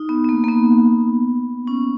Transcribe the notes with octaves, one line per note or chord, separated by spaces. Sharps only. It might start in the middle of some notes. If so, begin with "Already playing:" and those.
Already playing: D#4
B3
B3
A#3
A#3
B3
C#4